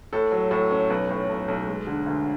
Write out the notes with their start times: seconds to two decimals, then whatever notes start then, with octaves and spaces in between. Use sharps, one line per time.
0.13 A2 A4
0.32 F#3
0.51 A2 A4
0.71 C#4
0.90 B1 B4
1.09 A2
1.29 B1
1.48 B1
1.68 G#3
1.87 D3
2.07 D2